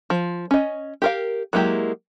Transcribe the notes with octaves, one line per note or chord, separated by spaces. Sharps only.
F3
C#4 D#5
G4 A#4 F5
F#3 G#3 A#3 E4 G4